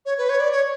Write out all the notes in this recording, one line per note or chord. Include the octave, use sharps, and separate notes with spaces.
C#5
B4
C#5
D5
C#5